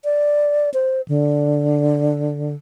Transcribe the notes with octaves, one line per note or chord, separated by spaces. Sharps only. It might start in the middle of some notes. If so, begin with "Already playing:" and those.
D5
C5
D3